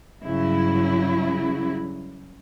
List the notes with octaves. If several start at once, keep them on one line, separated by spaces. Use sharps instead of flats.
G2 C#3 F#3 E4